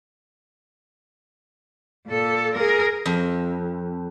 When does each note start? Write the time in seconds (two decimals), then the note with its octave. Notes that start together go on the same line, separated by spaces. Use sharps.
2.07 A#2 A4
2.55 G#4 A#4
3.06 F2